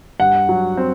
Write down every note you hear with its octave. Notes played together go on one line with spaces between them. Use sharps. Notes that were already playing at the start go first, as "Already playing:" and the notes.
G2 F#5
F#3
C4